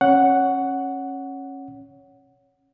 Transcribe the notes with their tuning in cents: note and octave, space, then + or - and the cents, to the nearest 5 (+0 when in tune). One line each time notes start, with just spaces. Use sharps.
C#4 -25 C#5 +15 F#5 +0